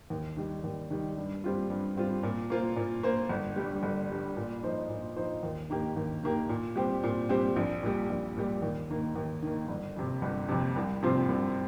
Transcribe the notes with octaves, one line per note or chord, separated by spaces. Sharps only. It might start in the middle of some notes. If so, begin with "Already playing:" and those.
D#2
D#3 G3
D#2
D#3 G3
G2
G3 C4 F4
G2
G3 C4 F4
A#2
A#3 F4 C5
A#2
A#3 F4 C5
G1
G2 G3
G1
G2 G3
A#2
F3 D#4 C5
A#2
F3 D#4 C5
D#2
D#3 A#3 G4
D#2
D#3 A#3 G4
A#2
G3 C4 G4
A#2
G3 C4 G4
A#1
A#2 G3
A#1
A#2 G3
D#2
D#3 A#3
D#2
D#3 A#3
G1
F2 C3
G1
F2 C3
C2
C3 F3 C4 F4
C2